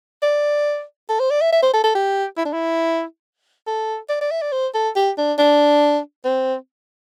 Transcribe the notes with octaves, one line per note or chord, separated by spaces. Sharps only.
D5
A4
C5
D5
E5
E5
C5
A4
A4
G4
E4
D4
E4
A4
D5
D5
E5
D5
C5
A4
G4
D4
D4
C4